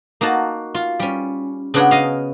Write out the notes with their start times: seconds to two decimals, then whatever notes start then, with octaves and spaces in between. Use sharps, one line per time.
0.21 A#3 D#4 F#4 A5
0.75 F4
1.00 G3 C#4
1.74 C#3 B3 D4 F#4 C#5 F#5
1.91 D#5 F5